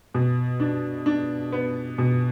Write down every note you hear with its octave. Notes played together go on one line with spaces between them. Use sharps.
B2
D4
D4
B3
B2